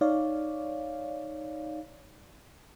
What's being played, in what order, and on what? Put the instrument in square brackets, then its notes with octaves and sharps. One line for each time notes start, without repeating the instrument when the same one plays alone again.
[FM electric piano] D#4 C#5 D5 F5